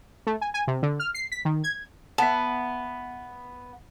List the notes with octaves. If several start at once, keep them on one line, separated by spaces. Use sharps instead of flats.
A3
G#5
G#5
C3
D3
F6
C7
B6
D#3
G#6
B3 E5 A5